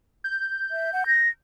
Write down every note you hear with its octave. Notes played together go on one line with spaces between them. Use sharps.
G6
E5
F#5
A#6